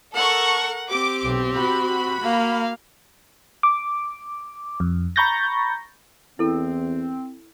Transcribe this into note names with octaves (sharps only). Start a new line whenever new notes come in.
A4 A#4 F#5 C#6
C4 G4 D6
B1
F#4 B5
A#3 F5
D6
F2
A#5 B5 C#6 G6 A6 A#6
E2 C4 E4 A4